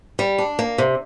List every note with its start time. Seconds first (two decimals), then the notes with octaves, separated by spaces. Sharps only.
0.19 G3
0.38 D4
0.59 A#3
0.78 C3